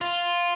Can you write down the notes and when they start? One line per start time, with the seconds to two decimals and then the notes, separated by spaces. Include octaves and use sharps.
0.01 F4